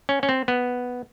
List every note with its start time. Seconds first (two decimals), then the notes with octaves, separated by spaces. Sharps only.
0.09 C#4
0.23 C#4
0.29 C4
0.48 B3